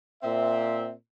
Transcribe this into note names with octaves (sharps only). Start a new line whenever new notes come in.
A#2 C4 E5